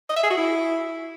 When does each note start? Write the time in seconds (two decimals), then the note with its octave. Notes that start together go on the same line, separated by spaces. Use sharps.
0.09 D#5
0.16 E5
0.23 G#4
0.30 F#4
0.37 E4